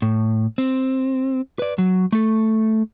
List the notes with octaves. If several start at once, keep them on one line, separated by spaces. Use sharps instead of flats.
A2
C4
B4 D5
F#3
A3 A4